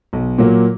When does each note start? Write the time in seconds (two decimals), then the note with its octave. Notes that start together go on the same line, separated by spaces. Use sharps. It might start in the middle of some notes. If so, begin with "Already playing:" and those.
0.13 B1
0.38 A#2 F#3 A#3